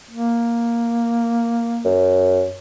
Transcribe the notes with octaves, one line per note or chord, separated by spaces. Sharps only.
A#3
F#2